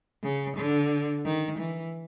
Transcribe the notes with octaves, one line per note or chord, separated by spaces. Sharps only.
C#3
D3
D#3
E3